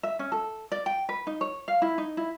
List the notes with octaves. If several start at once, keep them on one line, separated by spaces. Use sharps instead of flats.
E5
C#4
A4
D5
G5
B4
D#4
C#5
F5
E4
D#4
E4